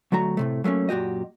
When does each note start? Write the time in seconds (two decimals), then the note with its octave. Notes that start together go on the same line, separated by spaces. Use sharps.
0.12 D2 F#3 A3 F#4 A#5
0.37 A2 C3 A3
0.64 F#3 A3 A#3 C#4
0.89 F#2 A#2 F#4 G4 D#5